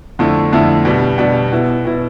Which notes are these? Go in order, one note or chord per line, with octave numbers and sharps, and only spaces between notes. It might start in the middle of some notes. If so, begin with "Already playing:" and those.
F2 D3 A3 E4
F2 D3 A3 E4
B2 G3 D4
B2 G3 D4
B2 B3 E4
B2 B3 E4